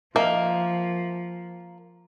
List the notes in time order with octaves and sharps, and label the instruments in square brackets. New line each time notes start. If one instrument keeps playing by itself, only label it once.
[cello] F3 [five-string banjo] A#3 [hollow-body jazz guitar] A#4 D#5 E5